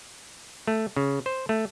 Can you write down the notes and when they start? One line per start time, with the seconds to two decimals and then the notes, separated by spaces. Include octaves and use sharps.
0.67 A3
0.96 C#3
1.26 C5
1.49 A3